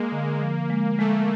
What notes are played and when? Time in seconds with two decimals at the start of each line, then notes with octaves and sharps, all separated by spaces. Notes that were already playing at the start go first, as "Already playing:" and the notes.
Already playing: G#3 A#3
0.12 D3
0.41 F3
0.70 G#3
0.99 G#3 A3